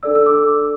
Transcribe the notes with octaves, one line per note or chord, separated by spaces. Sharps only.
D4 A4 D5 E6
E6
D6